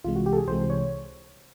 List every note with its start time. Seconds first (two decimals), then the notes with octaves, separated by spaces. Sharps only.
0.04 C2 C3 E3 G#3 F4
0.16 F#4
0.26 G4
0.33 A4
0.37 G#4
0.47 C2 C3 E3 G#3 C5
0.70 C#5